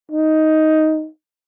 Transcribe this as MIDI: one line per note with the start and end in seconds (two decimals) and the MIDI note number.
0.11 1.07 63